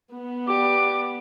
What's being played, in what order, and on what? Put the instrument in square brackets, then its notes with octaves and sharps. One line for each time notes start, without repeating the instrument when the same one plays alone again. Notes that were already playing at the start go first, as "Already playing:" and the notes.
[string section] B3
[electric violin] G4 D5 [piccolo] D6